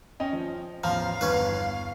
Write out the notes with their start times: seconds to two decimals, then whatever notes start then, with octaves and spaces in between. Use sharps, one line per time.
0.20 C#4 D#5 G5
0.33 F3
0.84 A1 E2 F3 F5 A#5
1.21 G1 E2 C#4 B4